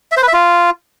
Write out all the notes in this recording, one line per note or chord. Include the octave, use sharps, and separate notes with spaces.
E5
C5
B4
E5
F4